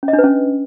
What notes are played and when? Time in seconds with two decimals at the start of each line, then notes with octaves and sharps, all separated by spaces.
0.03 C#4
0.08 D#5
0.13 D4
0.19 B4
0.24 C#4